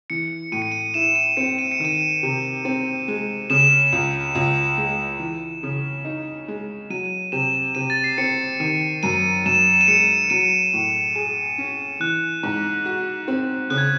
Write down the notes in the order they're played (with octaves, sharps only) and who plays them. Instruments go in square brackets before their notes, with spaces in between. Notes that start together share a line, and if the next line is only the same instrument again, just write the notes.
[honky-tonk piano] E3 [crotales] C#7
[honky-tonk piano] A2 [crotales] D#7
[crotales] C#7
D#7
[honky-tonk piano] E4 [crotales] E7
[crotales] D#7
[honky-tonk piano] C4 [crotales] C#7
[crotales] D#7
C#7
[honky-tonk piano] D#3 [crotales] D#7
[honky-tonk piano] C3
C4
G#3
[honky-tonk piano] C#3 [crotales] E7
[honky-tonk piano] C#2
C#2
G#3
E3
C#3
D#4
G#3
[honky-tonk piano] F#3 [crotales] D#7
[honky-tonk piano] C3 [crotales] E7
[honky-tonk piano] C3 [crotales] D#7
[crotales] A6
C7
[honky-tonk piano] C4 [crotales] C#7
[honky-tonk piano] D#3 [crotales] D#7
[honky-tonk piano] F#2 [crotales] D#7
[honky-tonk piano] F#2 [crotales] E7
[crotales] E7
D#7
[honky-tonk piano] G#3 [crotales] C#7
[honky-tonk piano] F#3 [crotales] D#7
[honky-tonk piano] A2
G#4
C#4
[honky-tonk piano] E3 [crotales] F#6
[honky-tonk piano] G#2
F#4
C4
[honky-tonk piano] C#3 [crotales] F#6
[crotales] G#6